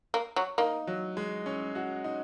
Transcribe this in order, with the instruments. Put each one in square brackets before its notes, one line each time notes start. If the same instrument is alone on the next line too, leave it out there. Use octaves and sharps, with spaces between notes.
[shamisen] A#3
F#3
[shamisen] A#3 [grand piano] D#4
[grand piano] F#3
G#3
C#4
F#4
D#4